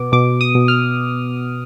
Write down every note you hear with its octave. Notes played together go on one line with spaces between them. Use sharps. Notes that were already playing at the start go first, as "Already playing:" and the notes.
Already playing: B2 B3 D6
B2 D6
D#6
B2
F6